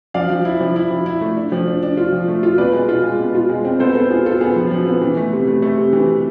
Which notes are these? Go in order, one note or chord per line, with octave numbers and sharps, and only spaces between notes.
F3 D5 F5
F3
E4
F3
E4
F3
E4
A3
D4
F3
D4
D4
F4
F3
A3
F4
B2 B4 D5
G#3
F4
G#3
B2
F4
G#3
C4
B3 A4 C5
B3 A4
F4 G#4
F4 A4
B3 G#4
F3
F3
B3
E3
A3
C3
A3
A3
C3
E3
C3